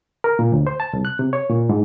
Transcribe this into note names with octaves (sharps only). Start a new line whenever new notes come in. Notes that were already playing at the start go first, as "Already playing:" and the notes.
A#4
A#2
D2
C5
A5
C2
F#6
C3
C#5
A#2
G#2